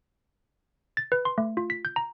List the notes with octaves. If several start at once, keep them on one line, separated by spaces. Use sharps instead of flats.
A6
B4
C6
A3
F4
B6
G6
A#5